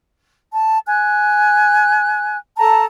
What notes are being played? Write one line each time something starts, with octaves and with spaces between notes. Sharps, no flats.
A5
G#5 F#6
A4 A5 A#5